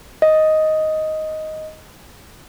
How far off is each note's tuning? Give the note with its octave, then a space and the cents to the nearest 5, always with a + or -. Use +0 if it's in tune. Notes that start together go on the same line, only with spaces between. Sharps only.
D#5 +5